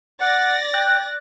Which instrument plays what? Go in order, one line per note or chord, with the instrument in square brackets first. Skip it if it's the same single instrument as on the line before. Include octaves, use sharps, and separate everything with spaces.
[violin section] D5 A6 A#6 [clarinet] F#5
[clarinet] G5 [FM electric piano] F#6